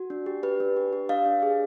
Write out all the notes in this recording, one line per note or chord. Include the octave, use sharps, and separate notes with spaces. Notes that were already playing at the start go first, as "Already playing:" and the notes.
Already playing: F#4
D4
G4
G4 B4
D4
G4
G4
D4 D#5 F5
D4
G#4